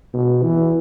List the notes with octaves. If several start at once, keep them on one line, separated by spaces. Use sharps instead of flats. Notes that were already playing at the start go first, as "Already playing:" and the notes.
B2
E3